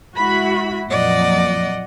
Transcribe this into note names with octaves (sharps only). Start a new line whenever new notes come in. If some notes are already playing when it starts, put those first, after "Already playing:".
G#3 E4 F#4 B5
F2 A#2 F#3 D5 D#5 F#5